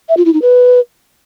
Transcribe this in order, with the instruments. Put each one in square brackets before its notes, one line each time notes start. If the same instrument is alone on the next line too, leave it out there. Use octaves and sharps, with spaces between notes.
[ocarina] E5
F4
E4
D#4
B4